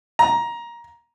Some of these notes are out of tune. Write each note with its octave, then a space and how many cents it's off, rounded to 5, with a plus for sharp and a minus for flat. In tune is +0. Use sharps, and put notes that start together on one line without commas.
A#5 +15